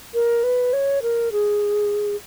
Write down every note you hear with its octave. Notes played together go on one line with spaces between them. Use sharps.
A#4
B4
C#5
A#4
G#4